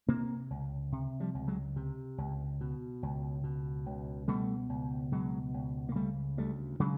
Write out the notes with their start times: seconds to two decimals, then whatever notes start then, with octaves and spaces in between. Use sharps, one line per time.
0.08 C3 A#3 C4
0.50 C#2
0.92 C3
1.20 F3 G3
1.34 C#2
1.48 F#3 G#3
1.76 C3
2.18 C#2
2.61 B2
3.03 C#2
3.43 B2
3.86 C#2
4.28 B2 G3 A3
4.69 C#2
5.12 B2 F#3 G#3
5.54 C#2
5.89 A#3
5.95 C#3 G3 A3
6.37 D2 G3 A3
6.80 C#3 F#3 G#3